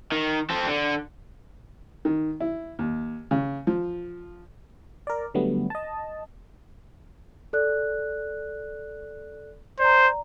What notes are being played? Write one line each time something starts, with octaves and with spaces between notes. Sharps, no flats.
D#3
C4 A4
D3
D#3
E4
D#2
C#3
F3
A#4 D5
D3 F#3 G3 A3 B3
D#5 A5
A4 D5 F#6
C5 D5 A#5